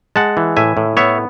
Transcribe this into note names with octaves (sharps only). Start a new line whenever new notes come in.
G#3 F#5 A5
E3
A2 E5 G#5
A2
B3 C#5 E5